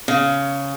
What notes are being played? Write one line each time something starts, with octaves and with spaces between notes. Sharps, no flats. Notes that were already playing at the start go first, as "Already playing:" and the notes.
C#3